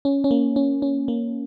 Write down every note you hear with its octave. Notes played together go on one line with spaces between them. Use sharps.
C#4
C#4
A#3
C#4
C#4
A#3